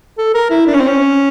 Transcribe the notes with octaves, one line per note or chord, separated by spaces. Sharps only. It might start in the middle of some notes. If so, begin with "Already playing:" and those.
A4
A#4
E4
D4
C#4
C4
C#4